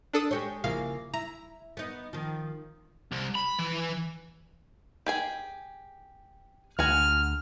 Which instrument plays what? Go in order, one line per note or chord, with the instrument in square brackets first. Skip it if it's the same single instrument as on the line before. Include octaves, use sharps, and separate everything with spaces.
[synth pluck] D4 A4 D#6
[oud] G#3 G4 C#5
[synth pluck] A#1 F5 [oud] C#3 A#3 E4
[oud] E4 [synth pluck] A#5
[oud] B3 D#4
D#3 F3
[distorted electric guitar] C2
B5
E3
[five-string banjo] G4 G#4 G#5
[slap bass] D2 [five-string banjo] F#4 G#4 G#5 [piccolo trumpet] F6